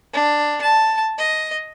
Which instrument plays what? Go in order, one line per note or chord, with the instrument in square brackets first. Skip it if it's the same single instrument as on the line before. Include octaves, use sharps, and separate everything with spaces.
[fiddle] D4
A5
D#5